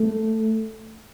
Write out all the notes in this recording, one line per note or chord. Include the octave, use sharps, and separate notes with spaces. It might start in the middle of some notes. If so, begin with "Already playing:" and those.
Already playing: A3